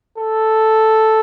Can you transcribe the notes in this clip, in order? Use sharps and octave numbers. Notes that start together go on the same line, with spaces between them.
A4